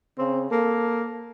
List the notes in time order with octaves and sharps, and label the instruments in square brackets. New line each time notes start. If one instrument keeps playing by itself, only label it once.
[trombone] C#3 [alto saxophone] C4
[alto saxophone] A#3 [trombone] A4